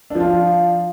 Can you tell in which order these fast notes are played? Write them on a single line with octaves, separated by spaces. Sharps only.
D4 F3 F4